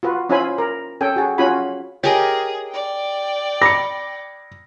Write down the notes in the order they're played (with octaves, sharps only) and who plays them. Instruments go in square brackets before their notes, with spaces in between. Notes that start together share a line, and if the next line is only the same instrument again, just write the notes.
[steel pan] F4 F#4 B4
C#4 E4 F4 C5 G#5 B5
A#4
C#4 A4 G5 G#5
F#4 G#4
C#4 F4 F#4 G#5 B5
[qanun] G4 A#4 D#5 [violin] G#4 [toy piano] C#5 G#5
[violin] D5 G5
[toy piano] B5 D6 [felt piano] A#6 C#7